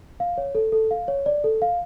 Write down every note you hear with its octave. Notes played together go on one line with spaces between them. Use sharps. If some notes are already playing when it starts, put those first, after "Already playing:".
F5
C#5
A4
A4
F5
C#5
D5
A4
F5